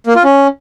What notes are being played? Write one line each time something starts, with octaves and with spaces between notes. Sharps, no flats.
A#3
F4
C#4